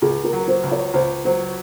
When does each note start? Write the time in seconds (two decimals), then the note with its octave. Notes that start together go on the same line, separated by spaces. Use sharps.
0.02 C#2 G#4
0.24 A#4
0.33 F#3
0.48 C5
0.63 C#2
0.71 C#5
0.94 C#2 C5
1.25 F#3 C5